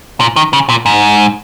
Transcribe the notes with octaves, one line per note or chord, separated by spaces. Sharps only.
A#2
D#3
C#3
A#2
G#2